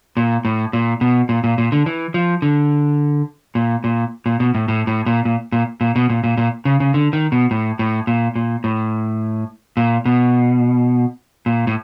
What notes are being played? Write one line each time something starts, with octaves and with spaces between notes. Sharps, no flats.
A#2
A2
A#2
B2
A#2
A#2
A#2
D3
E3
F3
D3
A#2
A#2
A#2
B2
A2
A2
A2
A#2
A#2
A#2
A#2
B2
A#2
A#2
A#2
C#3
C#3
D3
D#3
B2
A2
A2
A#2
A#2
A2
A#2
B2
A#2
A2